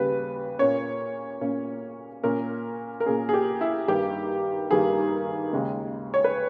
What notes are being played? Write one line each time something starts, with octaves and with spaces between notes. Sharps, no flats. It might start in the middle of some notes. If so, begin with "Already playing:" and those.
Already playing: D#2 C#3 G3 B4
A#2 A#3 C#4 C#5
A#2 A#3 C#4
A#2 A#3 C#4 A#4
A#4
A#2 A#3 C#4 G#4
G#4
G4
E4
G2 D#3 G3 A#3 G4
G2 D#3 G3 A#3 G#4
D#2 C#3 G#3
C#5
B4